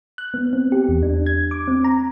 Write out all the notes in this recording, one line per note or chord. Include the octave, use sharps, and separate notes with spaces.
F#6
B3
C4
G4
E2
D4
G#6
D6
C4
A#5